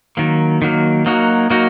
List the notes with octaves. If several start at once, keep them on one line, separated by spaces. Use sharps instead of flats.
D#3 F#3 A#3
D#3 F#3 A#3
F#3 A#3 D#4 F#4
F#3 A#3 D#4 F#4